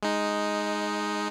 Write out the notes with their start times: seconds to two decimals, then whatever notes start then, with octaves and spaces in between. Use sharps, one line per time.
0.03 G#3 D#4